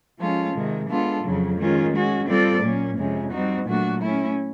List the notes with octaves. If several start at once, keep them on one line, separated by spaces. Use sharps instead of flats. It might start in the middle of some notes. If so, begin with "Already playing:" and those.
F3 G#3 C#4 F4 A4
C3 D#3 G#3
G#3 B3 D4 F4 A4
F2 C#3 F#3
D#3 G#3 C#4 F4
G#3 C#4 F#4
G3 C4 F4 A4 D5
A#2 F#3 A#3 C#4
F2 C3 F3 G#3 C#4
G3 C4 D#4 F#4
A#2 F#3 A3 D4 F#4
A3 C#4 E4